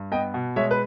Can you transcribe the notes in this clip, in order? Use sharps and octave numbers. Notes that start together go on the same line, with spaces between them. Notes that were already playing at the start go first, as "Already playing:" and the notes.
Already playing: G2
B3 D#5 G5
B2
G#3 C#5 E5
B4